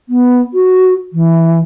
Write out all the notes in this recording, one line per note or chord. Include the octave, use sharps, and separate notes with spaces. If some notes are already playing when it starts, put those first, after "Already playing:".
B3
F#4
E3